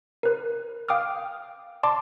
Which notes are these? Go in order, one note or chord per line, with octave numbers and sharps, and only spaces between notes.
A#4 B4
F5 G5 D6 D#6 F6
D5 A5 C6 D6